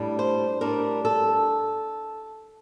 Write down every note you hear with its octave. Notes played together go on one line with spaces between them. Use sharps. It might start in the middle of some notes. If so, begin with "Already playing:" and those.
Already playing: A2 G3 D4
C5
A2 G3 D4 A#4
A4